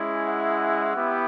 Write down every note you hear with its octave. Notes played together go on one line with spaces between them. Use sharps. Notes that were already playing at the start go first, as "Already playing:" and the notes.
Already playing: G#3 C#4 E4
E5 F#5
B3 E4 G4